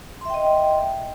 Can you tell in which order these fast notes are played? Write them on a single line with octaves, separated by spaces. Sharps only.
C6 E5 G5 D#5